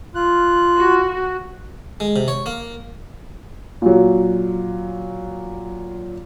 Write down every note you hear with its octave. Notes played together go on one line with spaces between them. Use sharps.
F4 F#6
F#4
G#3
C3
C#5
A#3
A#2 F#3